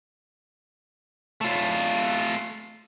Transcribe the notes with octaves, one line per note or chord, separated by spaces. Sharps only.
A3 F4